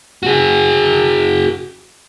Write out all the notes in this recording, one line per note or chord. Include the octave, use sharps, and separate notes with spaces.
F#4 G#4